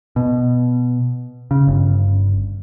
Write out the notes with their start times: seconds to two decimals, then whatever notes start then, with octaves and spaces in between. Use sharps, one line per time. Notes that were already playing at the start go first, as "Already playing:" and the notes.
0.16 B2
1.51 C#3
1.67 G1